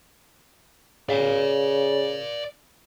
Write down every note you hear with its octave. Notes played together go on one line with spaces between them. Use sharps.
C#3 D5 F5